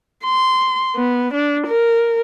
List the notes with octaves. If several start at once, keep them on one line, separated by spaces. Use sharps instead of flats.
C6
B3
D4
A#4